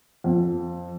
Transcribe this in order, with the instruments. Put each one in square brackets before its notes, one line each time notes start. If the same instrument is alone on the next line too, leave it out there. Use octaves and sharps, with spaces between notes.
[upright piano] F2